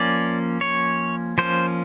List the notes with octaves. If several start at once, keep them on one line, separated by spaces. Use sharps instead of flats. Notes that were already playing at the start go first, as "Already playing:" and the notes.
Already playing: F3 A#3 C#4 D5
C#5
F3 A#3 C#4 C5